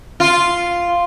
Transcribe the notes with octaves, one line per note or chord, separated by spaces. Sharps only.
F4